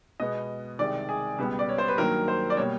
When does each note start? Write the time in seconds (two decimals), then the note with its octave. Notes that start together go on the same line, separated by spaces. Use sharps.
0.20 B2 G#3 B3 D#5
0.79 C2 C3 D#3 G#3 D5
1.09 G#4
1.38 C#2 B2 G3 B3
1.59 D5
1.69 C#5
1.78 C5
1.88 B4
1.98 G2 D#3 F#3 A#3 A#4
2.28 C5
2.50 D5
2.57 B2 G3 A#3 C#5